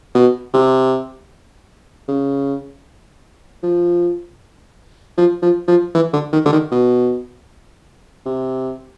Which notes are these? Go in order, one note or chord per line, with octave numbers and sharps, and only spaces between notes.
B2
C3
C#3
F3
F3
F3
F3
E3
D3
D#3
D3
D#3
B2
C3